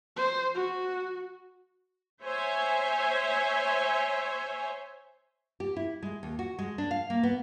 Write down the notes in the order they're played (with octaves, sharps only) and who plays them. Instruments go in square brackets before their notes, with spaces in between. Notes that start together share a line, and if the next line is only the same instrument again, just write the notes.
[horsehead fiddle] C5
F#4
[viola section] C5 C#5 E5 G#5
[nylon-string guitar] G4
E4
G#3
D#2
F#4
G#3
D4
F5
A#3
B3